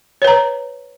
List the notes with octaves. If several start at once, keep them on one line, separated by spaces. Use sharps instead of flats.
B4 C#5 A#5